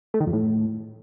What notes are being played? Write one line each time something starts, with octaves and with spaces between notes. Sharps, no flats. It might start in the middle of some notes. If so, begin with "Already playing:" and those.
A3
D#3
F2
A2